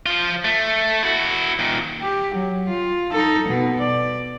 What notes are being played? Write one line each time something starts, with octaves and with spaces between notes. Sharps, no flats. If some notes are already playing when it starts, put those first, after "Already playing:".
F3 F4
A3
E4 F#4
A#2 D#3
G4
F#3
F4
D#4 A4
B2
D5